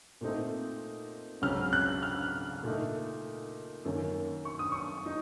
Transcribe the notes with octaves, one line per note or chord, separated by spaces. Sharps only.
A#2 A3 C4 D#4
C#2 C#3 F#3 C4 F6
F#6
F6
A#2 A3 D#4
F#2 D#3 A#3 C#4
C#6
D#6
C#6
D#4